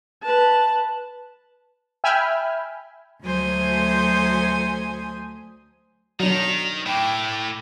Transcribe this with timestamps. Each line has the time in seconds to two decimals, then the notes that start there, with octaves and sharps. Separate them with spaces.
0.23 B4 A5
2.04 E5 G5 G#5 B5 F6
3.22 D2 F#3 A3 C5 G#5 D#6
6.20 D#3 F#3 D4 F7
6.86 A2 G5 D6